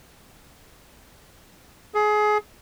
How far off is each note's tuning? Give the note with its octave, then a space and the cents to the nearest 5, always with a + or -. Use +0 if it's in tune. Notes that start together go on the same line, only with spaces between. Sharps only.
G#4 +25